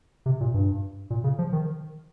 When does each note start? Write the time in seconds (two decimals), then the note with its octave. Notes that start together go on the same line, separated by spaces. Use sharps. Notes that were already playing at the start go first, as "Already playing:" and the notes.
0.26 C3
0.40 A#2
0.54 G2
1.10 A#2
1.24 C#3
1.39 F3
1.53 D#3